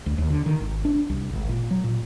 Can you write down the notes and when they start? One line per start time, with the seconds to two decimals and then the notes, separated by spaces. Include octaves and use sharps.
0.06 D2
0.18 D#2
0.30 D3
0.46 D#3
0.60 G#1
0.85 D4
1.09 C2
1.33 G#1
1.49 A#2
1.71 F#3
1.84 A#2